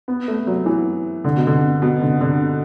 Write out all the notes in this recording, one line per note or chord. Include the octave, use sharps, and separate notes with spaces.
B3
A3
F#3
E3
D3
B2
D3
B2
D3
D3